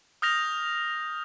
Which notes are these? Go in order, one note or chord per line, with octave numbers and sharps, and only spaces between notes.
D#6 F6 G6 A#6 F7